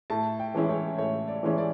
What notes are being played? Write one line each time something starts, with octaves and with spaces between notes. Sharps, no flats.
A2 A5
G5
E3 G#3 C#4 E4
C#5
A2 C#5
D5
E3 G#3 C#4 E4
D5